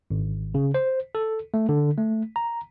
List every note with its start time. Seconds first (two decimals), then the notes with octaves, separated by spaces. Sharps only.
0.11 G#1
0.55 C#3
0.74 C5
1.15 A4
1.54 A3
1.69 D3
1.98 A3
2.36 A#5